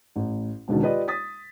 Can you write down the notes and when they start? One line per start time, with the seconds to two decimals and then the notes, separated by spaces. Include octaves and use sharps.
0.16 A1
0.68 E1 C#2 B2 D3 D#3
0.82 F4 G4 B4 D5 D#5
1.08 D#6 A6 B6